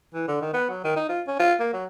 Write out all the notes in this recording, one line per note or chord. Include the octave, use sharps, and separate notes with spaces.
E3
D3
D#3
B3
F#3
D#3
D#4
F4
C#4
F4
A#3
F#3